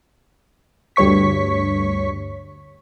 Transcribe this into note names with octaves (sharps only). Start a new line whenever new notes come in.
D2 G2 C#5 C#6 B6